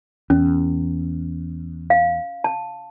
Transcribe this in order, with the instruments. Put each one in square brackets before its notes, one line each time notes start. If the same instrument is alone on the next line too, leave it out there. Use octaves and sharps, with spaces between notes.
[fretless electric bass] E2 [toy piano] C#4
[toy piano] F5
A5